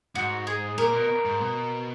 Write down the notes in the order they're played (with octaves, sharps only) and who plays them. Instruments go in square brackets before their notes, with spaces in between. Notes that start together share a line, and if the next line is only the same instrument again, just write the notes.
[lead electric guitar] G#2 [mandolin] F#4
[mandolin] G#4
[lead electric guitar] A#2 [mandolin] A#4
[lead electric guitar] B2
G#2
B2